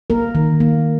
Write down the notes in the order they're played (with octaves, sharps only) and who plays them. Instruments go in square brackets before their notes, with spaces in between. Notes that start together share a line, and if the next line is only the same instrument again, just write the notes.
[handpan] A#3 A#4
D#3
A#3